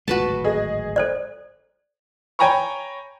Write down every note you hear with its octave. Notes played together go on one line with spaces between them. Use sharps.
D1 G#1 G#3 F#4 B4 A5
G#4 D#5
A4 C5 D5
C#5 G5 G#5 A#5 B5 C#6